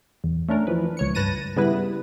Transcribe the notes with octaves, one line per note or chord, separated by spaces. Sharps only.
E2
A3 C#4 D4 A#4
E3 F3 B4
C#2 C#5 C#7
G2 B4 A5 A#6 D#7
C#3 G3 B3 E4 B4